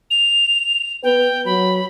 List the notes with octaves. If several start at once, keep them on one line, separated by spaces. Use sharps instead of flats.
F7
B3 B4 G5
F#3 B5